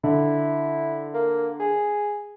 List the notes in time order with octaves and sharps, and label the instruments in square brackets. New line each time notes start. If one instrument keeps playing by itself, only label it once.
[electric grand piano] D3 [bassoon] E4
[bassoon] A#3
G#4